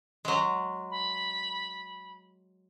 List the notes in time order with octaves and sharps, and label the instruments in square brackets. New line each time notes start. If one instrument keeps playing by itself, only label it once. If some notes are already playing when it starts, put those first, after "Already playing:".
[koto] F#3 G#3
[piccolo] B5